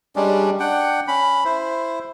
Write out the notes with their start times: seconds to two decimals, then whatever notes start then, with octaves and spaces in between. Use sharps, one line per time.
0.16 G3 G#3 C#4 D4
0.60 D4 F#5 G5
1.08 C#4 B5
1.45 E4 C5